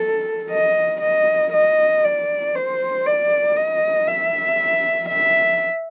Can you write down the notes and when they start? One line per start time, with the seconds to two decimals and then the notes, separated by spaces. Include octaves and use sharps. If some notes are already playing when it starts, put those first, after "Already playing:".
Already playing: A4
0.51 D#5
1.01 D#5
1.53 D#5
2.04 D5
2.55 C5
3.06 D5
3.56 D#5
4.08 E5
5.09 E5